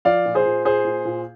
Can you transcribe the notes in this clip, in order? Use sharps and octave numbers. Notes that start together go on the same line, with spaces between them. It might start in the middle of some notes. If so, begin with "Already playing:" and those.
F3 D5 F5
A#2
G#4 C5
A#2
A#2 G#4 C5
A#2
A#2